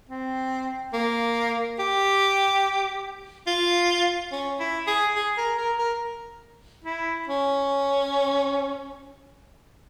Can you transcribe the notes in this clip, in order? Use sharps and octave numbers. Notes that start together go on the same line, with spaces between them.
C4
A#3
G4
F4
C#4
E4
G#4
G#4
A#4
A#4
A#4
E4
C#4